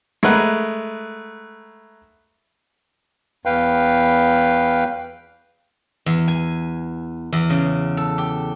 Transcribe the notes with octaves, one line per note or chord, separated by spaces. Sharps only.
G#3 A3 A#4 B4 F#5
E2 B4 F5 G5
E2
G#5
E2
C#3
A4
G4